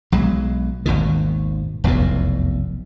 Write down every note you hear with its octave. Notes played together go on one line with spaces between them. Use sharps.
B1 F#3 G#3
G#1 D#2 B2 D#3
F1 B1 E2 B2